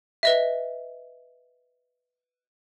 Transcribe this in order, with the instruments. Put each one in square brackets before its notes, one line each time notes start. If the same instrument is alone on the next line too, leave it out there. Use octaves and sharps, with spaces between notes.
[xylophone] B4 D#5 E5